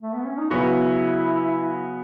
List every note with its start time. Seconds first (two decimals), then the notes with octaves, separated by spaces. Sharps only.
0.02 A3
0.14 B3
0.26 C#4
0.38 D#4
0.50 C#3 F#3 B3 E4 F#4